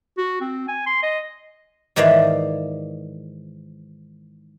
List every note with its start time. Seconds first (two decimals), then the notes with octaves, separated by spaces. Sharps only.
0.18 F#4
0.41 C4
0.68 G#5
0.86 C6
1.03 D#5
1.96 G#2 D#3 E3 D5 E5 F5